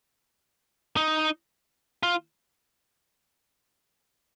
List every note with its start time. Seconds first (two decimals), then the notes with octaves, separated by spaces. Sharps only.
0.97 D#4
2.03 F4